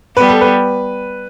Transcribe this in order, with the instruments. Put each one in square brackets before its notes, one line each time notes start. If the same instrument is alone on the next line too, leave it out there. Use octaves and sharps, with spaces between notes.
[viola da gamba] G3 B3 [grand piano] B4
[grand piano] A4
B4